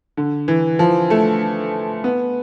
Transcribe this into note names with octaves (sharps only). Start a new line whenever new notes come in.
D3
E3
F3
A3
B3